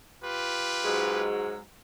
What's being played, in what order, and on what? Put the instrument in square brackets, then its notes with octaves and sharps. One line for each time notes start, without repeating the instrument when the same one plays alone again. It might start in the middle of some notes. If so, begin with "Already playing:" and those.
[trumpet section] F4 G4 B4
[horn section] G#2 F#3 G#3